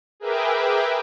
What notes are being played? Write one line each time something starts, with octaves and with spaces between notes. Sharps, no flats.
G#4 A#4 B4 E5 G5 D6